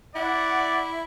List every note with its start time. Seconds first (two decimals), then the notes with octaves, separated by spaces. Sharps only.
0.16 E4 D5 F#5